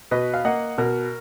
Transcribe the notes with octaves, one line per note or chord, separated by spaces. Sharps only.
B2 B4 D#5
F5
A#3 D#5 F#5
B2 F#4 A#4